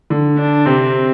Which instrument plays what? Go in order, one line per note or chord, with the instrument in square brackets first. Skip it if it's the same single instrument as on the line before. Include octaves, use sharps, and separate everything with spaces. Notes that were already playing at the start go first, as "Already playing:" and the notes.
[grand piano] D3
[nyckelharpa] D4
[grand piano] C3 [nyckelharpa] C4